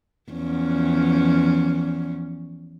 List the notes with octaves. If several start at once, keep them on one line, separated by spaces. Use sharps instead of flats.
E2 F3 C#4